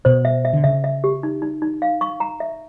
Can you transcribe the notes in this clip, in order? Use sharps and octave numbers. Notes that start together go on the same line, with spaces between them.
B2 C5
E5
E5
D3
C#3 E5
E5
G4
D#4
D#4
D#4
F5
C#6
A#5
E5